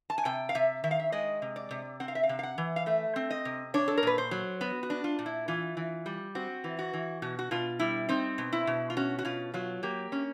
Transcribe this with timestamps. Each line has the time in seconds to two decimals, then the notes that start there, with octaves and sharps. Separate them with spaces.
0.10 A5
0.18 G#5
0.25 C3 G5
0.49 F5
0.55 C3 E5
0.84 D#3 E5
0.91 F5
1.00 E5
1.12 G#3 D#5
1.42 C3
1.56 D5
1.71 C3
2.00 C4 F#5
2.08 F5
2.15 E5
2.23 F5
2.29 C3
2.39 F5
2.43 F#5
2.58 E3
2.76 F5
2.86 A3 E5
3.16 C4
3.31 D#5
3.45 C3
3.74 D4 C#5
3.88 A4
3.97 A#4
4.03 A#2 B4
4.18 C5
4.31 F#3
4.61 B3 F#4
4.83 F#4
4.90 D4
5.04 F4
5.19 A#2
5.26 E4
5.48 E3 F4
5.77 E3
6.06 G3
6.35 C4 F#4
6.64 E3
6.79 F#4
6.93 E3
7.22 B2 F#4
7.39 F#4
7.51 B2 F4
7.79 G3 E4
8.09 C4 D#4
8.38 B2
8.53 E4
8.67 B2
8.90 F4
8.97 C#4 F#4
9.19 F#4
9.25 B2 F4
9.54 F#3 F4
9.83 A#3 G4
10.12 C#4